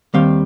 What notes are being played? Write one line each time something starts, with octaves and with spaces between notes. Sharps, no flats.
D#2 D#3 G3 C4 F5